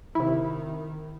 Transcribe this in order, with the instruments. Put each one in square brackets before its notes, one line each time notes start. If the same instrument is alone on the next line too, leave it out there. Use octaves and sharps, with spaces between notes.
[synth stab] C3 E4 [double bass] D#3